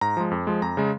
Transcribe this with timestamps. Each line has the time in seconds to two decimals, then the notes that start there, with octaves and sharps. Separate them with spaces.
0.01 G#2 A#5
0.17 F3 G#3
0.31 F2
0.47 F3 G#3
0.62 F2 A#5
0.77 C#3 G#3